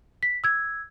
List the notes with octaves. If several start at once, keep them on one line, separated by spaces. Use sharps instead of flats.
B6
E6 G#6